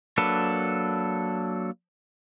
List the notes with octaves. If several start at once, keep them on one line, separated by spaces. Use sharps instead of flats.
F#3 A#3 D4 A4 B4